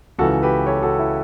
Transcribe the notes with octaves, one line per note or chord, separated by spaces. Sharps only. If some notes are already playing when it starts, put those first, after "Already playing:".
C#2 C#3 E3 F#4 A4
G4 B4
A4 C#5
F#4 A4
E4